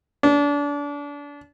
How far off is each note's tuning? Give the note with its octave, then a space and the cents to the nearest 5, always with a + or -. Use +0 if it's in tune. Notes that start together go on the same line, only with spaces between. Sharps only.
D4 -30